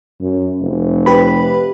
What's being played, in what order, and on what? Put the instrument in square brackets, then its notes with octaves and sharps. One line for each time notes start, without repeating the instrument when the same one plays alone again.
[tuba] F#2
F1
[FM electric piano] G4 B4 B5